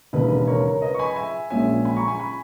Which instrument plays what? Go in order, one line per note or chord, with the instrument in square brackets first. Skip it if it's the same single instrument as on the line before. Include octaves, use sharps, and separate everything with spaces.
[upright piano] E1 D#2 C#3 B4
A#4 C#5
B4 D#5
C#6
G#5 B5
E5 G#5
A#1 A#2 G#3 C#4 E5 G#5
G#5 B5
A#5 C#6
G#5 B5
G#5 B5